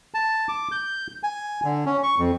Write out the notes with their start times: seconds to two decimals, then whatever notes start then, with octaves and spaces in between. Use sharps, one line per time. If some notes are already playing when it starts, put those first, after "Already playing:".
0.14 A5
0.49 D6
0.72 G6
1.23 G#5
1.65 D3
1.86 C#4
2.03 C#6
2.18 F2